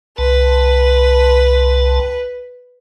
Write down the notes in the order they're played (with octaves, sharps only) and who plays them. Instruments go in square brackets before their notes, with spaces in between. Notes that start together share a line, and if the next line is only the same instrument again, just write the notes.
[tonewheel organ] C2 A5 [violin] B4